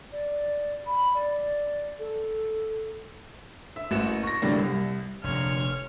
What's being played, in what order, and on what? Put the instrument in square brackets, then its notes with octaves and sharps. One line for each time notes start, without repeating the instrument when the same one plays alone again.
[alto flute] D5
B5
D5
A4
[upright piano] E5
A1 A#3 F#4 E7
C#6 A#6
A2 D3 F#3 G3 A#3
C2
[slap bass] F1 F2 [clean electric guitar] A#2 D3 [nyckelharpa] C#5 [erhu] F6